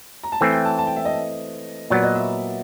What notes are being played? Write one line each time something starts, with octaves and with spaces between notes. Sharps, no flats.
A#5
A5
E3 A3 C4 G#5
G5
A5
A5
G5
E5
D#5
A#2 F#3 B3 D5
D#5
E5